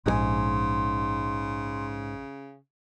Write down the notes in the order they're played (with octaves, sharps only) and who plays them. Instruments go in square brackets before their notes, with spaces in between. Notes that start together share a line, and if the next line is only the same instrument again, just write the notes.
[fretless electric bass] A#1 [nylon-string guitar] G#2 G#4 G#5 [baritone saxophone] C#3 [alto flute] C6